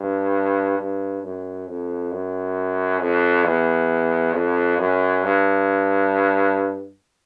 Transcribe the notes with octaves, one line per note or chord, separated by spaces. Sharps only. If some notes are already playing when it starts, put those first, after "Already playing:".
Already playing: G2
G2
F#2
F2
F#2
F2
E2
F2
F#2
G2